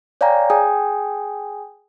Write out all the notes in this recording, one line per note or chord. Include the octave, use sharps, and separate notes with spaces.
C#5 D5 F5 G5 G#5 A#5
G#4 G5 G#5 D#6